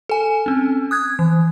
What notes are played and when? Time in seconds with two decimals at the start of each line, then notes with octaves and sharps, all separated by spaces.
0.09 A4 G#5
0.46 C4 C#4
0.91 D#6 F#6 G#6
1.19 E3